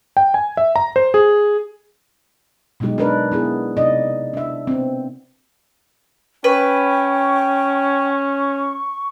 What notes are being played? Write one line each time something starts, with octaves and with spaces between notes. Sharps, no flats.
G5
G#5
E5
A#5
C5
G#4
B2 F#3 G#3 D#4 G4
D4 D#4 A#4 B4 D5
B3 E4 G#4
C3 D#4 D5 D#5
D4 E5
B3 C4
C#4 B4 G5 C#6